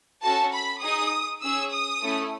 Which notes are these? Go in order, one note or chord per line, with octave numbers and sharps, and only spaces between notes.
C#4 F#4 A4 A5
B5
D#4 G#4 D#6
C#4 G#4 E6
D#6
A3 C#4 E4 A4